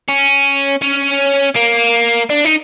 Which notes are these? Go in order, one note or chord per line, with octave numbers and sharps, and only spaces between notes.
C#4
C#4
A#3
D4
D#4